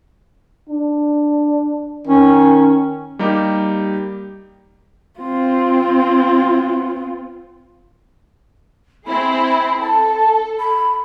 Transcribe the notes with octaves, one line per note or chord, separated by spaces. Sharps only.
D4
D#3 C#4
G3 A#3 D#4 G4
C4 F4
C4 E4 G#4 B5
A4 A5
B5